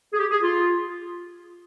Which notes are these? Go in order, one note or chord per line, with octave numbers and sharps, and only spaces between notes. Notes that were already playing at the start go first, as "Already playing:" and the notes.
G#4
G4
G#4
F4